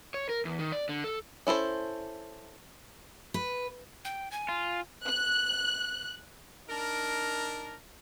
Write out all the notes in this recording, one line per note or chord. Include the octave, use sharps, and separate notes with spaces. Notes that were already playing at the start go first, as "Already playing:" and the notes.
C#5
A#4
E2
D#3
D5
D3
A4
C#4 E4 A4 C5
B4
G5
G#5
F4
F#6
D4 D#4 A#4